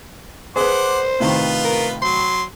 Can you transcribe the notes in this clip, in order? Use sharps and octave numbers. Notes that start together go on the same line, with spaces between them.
G#4 B4 C5 F#5 C6 D6
A2 C3 D#3 B3 F4 B4
A#4
F#3 C6